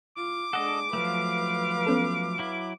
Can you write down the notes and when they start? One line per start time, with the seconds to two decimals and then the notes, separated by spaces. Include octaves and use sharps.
0.17 F4 D6
0.53 G#3 D4 A4 D#5 F#5
0.93 F3 F#3 A3 B4 F5
1.87 B3 C#4 A4
2.39 F#3 E4